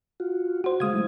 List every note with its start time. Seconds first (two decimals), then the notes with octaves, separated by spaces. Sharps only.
0.20 F4 F#4
0.64 F#4 C5
0.80 C#3 G#3 F5 D#6 G#6
0.93 F#3 A3 E4